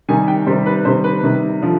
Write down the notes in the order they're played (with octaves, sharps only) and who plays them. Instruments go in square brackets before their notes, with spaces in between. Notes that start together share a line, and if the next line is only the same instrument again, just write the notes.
[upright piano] C3 D#3 G3 G#5
G5
C3 D#3 G3 C5
B4
C3 D#3 G3 C5
B4
C3 D#3 G3
D3 F3